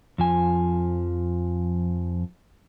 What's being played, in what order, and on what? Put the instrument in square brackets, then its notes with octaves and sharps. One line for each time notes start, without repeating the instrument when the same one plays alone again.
[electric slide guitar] F2 F3 G#5